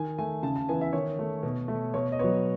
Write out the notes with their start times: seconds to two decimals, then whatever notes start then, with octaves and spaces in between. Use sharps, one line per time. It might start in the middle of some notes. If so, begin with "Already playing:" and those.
Already playing: D#3 G#5
0.18 A3 G#5
0.43 C#3 A5
0.56 A5
0.68 E3 B3 G#5
0.81 E5
0.93 D#3 C#5
1.19 A3
1.43 B2
1.68 A3
1.94 B2 C#5
2.12 D#5
2.19 F#3 B3 C#5